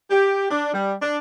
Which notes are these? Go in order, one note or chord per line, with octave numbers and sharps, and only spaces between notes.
G4
D4
G3
D4